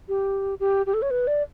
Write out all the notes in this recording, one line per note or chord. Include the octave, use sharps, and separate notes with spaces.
G4
G4
G4
A4
C#5
B4
D5